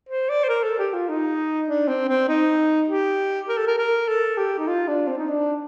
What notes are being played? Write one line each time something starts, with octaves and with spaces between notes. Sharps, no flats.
C5
D5
C5
A#4
A4
G4
F4
D#4
D4
C4
C4
D#4
G4
A#4
A4
A#4
A#4
A4
G4
D#4
F4
D4
C4
D#4
D4